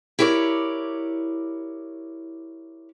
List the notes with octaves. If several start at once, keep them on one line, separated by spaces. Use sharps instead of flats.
E4 G4 A#4 C#5 D5